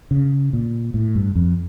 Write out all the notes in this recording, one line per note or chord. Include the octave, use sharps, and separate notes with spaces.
C#3
A#2
A2
G2
F2